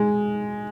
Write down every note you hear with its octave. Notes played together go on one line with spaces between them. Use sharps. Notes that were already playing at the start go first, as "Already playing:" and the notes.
Already playing: G#3